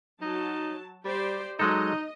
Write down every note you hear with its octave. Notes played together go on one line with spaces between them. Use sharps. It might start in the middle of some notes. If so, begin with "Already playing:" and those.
F#3 D#4 A5
G3 G4 C5 D5
F#3 G#3 D#4 A4 D#5